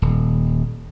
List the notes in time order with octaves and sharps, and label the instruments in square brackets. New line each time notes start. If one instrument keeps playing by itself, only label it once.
[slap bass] D#1